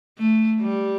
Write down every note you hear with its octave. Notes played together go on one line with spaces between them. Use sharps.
A3
G3